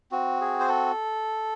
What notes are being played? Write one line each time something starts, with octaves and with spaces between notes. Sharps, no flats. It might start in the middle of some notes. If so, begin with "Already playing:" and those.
C4 F#4
G#4
C5
A4